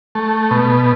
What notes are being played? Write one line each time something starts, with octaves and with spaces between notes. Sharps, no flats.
A3
B2